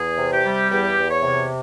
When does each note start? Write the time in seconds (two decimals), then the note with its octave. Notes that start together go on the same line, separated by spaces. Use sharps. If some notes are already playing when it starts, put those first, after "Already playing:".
Already playing: E2 G#4
0.18 C3
0.31 G4
0.44 G3
0.70 E2 G4
0.97 E2
1.09 C#5
1.23 C3